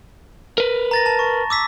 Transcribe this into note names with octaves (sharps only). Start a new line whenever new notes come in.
A#4 B4
A#5 A6 A#6
A5
C#6
D6 E6 B6